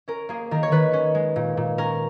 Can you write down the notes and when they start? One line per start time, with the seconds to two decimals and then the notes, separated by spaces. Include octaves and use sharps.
0.08 C#4 A#4
0.29 A#3 G#4
0.51 D#3 A#4
0.63 C#5
0.72 D#3 B4
0.93 C#4
1.15 G#3
1.36 A#2
1.57 A#2
1.78 C#4 A#4